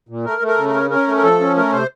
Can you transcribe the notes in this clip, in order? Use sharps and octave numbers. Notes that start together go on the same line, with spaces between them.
A#2
A3 A#4
A3
A#4
C#3
A#4
C#4
C#4 A#4
A3
A#4
F3 A4
C#4
A3 A#4
C3 C5